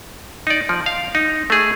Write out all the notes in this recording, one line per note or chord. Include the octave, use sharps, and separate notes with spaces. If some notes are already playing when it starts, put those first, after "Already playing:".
D#4 D5
F3
F5
D#4
A3 G#4